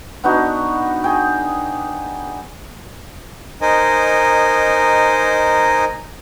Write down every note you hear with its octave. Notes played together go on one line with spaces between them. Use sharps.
B3 D4 D#4 F#4
G#4 G5
D#4 A#4 C5 D#5 G#5